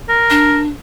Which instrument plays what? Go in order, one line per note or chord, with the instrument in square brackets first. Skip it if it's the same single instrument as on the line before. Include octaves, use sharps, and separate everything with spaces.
[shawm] A#4
[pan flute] D4